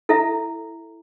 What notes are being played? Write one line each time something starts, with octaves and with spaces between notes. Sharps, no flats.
E4 A4 E5 A#5